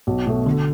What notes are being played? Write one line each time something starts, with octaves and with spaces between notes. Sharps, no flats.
B1
B2 A3
D3